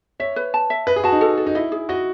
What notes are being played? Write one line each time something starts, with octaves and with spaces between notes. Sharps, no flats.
C#5 E5
B4
A5
E5
B4 D#5
G#4
F#4 A5
D#4
A4
A4
D#4
E4 D#5
G#4
F#4 D#5